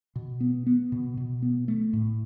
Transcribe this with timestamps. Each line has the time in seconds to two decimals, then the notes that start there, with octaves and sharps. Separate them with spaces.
0.16 B2
0.40 B3
0.66 B3
0.92 B2
1.17 B2
1.42 B3
1.68 A3
1.93 A2